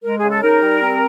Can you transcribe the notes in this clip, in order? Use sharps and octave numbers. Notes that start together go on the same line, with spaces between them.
G#3 A#4
G#4
C#3
A4
D#4 A#4
G3
C4